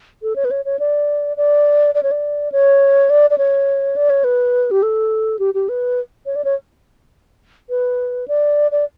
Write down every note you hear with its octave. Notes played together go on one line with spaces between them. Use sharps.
A4
C#5
B4
C#5
C#5
D5
D5
D5
C#5
D5
C#5
D5
D5
C#5
D5
C#5
B4
G4
A4
G4
G4
B4
C#5
D5
C#5
B4
D5
D5